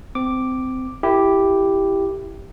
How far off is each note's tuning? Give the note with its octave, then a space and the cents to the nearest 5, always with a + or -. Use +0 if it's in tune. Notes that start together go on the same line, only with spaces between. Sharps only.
C4 -20 D6 +0
E4 +10 G4 +0 A#4 -45